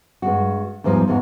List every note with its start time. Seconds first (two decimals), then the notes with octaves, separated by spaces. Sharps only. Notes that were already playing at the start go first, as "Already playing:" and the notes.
0.22 G2 G#3 F#4
0.84 E2 G#2 F3 G3 D#4 F4
1.08 E2 G#2 E3 F#4 F5